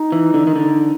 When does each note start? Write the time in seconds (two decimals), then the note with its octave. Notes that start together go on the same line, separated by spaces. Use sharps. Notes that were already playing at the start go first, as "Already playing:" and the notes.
Already playing: D#4
0.12 E3
0.34 D3
0.47 D#3
0.56 D3